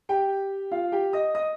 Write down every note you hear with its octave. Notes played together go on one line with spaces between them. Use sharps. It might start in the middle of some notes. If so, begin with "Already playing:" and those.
G4 G5
F4 F5
G4 G5
D#5 D#6
D#5 D#6